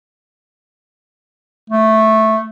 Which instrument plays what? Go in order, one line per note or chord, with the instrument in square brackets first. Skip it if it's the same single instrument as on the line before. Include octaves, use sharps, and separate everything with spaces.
[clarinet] A3